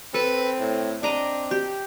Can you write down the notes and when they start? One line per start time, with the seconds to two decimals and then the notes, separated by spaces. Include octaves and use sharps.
0.14 C4 A4 B4
0.59 A2
1.03 C4 D4 D#5 A#5 D6
1.51 G4